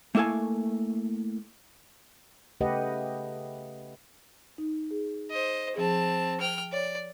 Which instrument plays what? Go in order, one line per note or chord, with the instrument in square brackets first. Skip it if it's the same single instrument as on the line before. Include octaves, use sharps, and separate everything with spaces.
[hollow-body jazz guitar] A3 A#3 E4 A4 F5 G#5
[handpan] C#3 A3 G4 B4 D#5 F#5
[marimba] D#4
G#4
[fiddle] C5 D#5
[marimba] F3 G#4 [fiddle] C4 A5
[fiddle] G5 F6
[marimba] C#5 [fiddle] D5